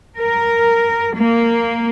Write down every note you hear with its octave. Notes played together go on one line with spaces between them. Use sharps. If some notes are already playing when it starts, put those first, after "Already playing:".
A#4
A#3